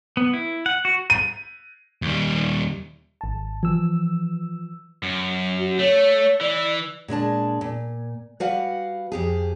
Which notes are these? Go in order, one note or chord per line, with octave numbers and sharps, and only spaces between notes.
B3
E4
F#5
F#4
D#7
D#2 G3
G#1 A5
E3 F3 E6
F#2
F#4
A3 C#5
E3 D5
A#2 G#3 D4 A5
A#2
G3 F#4 B4 F5 F#5
F2 G4 G#4